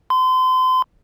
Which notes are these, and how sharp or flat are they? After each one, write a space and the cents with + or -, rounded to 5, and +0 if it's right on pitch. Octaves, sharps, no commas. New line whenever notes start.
C6 -35